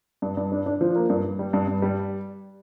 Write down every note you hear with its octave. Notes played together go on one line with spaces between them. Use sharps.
G2
G2
D4
D4
F3
A#3
G2
G2
G3
G2
G2
G3